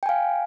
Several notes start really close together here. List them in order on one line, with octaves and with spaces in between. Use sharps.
G5 G#5 F5